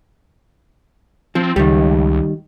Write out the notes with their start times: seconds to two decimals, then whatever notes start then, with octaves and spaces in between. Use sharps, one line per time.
1.35 F3 C4
1.56 C#2 D#3 G3